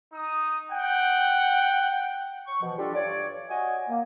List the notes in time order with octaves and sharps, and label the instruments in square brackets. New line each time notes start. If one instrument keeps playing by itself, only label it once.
[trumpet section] D#4 D#6
[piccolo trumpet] F#5 [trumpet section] G5
[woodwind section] C#6
B2 E3 F3
G3 D4 F4 G4 A4
G2 C#5 D5
F#4 C#5 D#5 G#5
A#3